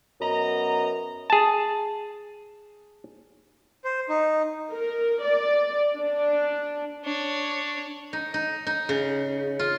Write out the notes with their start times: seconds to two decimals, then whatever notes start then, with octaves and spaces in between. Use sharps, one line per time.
0.20 F#2 B3 D#5 A#5
1.30 G#4 A5
3.84 C5
4.09 D#4
4.71 A#4
5.23 D5
5.97 D4
7.05 D4 C#5
8.13 D#4
8.34 D#4
8.67 D#4
8.89 C#3
9.59 F4